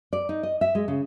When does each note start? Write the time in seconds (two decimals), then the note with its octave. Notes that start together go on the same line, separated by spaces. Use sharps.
0.13 D5
0.29 D#4
0.43 D#5
0.61 E5
0.75 G#3
0.88 C#3